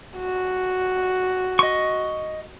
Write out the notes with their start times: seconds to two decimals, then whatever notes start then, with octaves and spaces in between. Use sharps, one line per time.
0.18 F#4
1.59 D#5 C#6